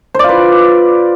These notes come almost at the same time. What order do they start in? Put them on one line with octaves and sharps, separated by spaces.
C5 D5 F4 B4